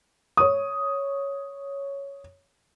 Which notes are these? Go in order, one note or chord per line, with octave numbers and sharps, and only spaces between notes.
C#5 D#6